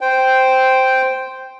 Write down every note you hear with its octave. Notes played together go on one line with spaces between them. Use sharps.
C5 G5